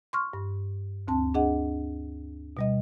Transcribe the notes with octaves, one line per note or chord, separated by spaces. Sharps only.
C6 C#6 F6
G2
D2 C4 A5
D4 G#4 D#5 F#5
B2 G3 D#5